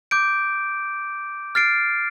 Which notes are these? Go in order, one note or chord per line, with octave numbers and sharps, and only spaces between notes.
D6 G6 D7
F6 A6 C7 D7